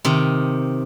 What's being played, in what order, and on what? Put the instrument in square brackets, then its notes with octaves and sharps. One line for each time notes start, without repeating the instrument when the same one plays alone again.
[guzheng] C3 D#3